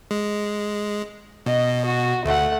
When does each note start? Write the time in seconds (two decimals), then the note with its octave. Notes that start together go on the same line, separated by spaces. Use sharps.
0.11 G#3
1.46 B2 D#5
1.85 F#4
2.25 D2 A3 F#5